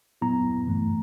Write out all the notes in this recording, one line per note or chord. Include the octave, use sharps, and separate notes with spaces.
A#2 F#3 B3 E4 A#5
G2 E3 A3